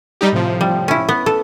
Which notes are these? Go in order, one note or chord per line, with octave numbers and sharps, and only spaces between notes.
G3 D#4 G4
A2 C3 F3
G3
C#4 E4
B3
A4